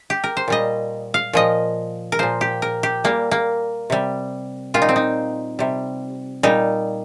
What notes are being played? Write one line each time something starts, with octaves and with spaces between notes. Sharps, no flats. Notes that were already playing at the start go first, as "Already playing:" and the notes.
Already playing: F4
G4
A#4
C5
A#2 G3 D#5
F5
A#2 F3 D#5
A#4
A#2 F3 C5
G4
A#4
G4
A#2 G3 A#3
A#3
C3 G3
A#2 G3 F4
D#4
C4
D#4
C3 G3
A#2 G3 D#4